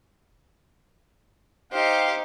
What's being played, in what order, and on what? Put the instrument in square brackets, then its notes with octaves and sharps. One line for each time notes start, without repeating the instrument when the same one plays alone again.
[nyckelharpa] D#4 [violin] G4 C5 [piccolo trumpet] F5